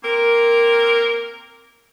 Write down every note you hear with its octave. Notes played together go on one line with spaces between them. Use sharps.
A#3 C4 A#4